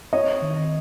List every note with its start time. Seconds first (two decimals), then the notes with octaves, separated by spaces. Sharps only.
0.13 C4 C#5 D#5
0.42 D#3